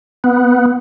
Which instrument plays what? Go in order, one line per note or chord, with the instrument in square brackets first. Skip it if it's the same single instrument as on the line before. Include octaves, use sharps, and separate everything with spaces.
[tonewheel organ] B3